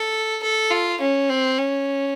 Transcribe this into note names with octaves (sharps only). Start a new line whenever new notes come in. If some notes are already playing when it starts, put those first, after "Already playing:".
Already playing: A4
A4
F4
C#4
C4
C#4